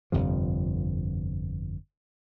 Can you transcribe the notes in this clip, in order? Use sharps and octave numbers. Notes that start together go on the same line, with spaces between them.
G1 F2 C3 F3